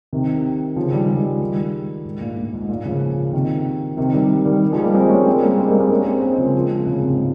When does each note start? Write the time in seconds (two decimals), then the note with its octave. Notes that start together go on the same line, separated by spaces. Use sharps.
0.13 C3 D#3
0.76 C#3 F3
0.93 D#3 G3
1.09 F3 G#3
1.40 D#3 G3
2.05 G#2
2.20 A#2
2.37 A#2
2.54 G#2
2.69 A#2
2.85 C#3 F3
3.33 C3 D#3
3.97 C3 D#3
4.13 D#3 G3
4.45 D#3 G3
4.72 F3 G#3
4.83 G3 A#3
4.94 G#3 C4
5.10 A#3 C#4
5.26 G#3 C4
5.42 G3 A#3
5.58 G#3 C4
5.69 G3 A#3
5.80 G#3 C4
5.90 A#3 C#4
6.07 G#3 C4
6.22 G#3 C4
6.38 C#3 F3
6.54 F3 G#3
6.70 G#3 C4
6.87 A#2 C#3
7.02 G#2 C3